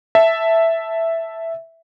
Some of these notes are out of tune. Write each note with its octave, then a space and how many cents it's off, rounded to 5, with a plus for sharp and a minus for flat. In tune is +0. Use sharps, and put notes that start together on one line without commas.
E5 +0 A5 +0